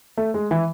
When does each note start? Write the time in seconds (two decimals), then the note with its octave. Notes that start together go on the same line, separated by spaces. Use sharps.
0.18 A3
0.34 G#3
0.51 E3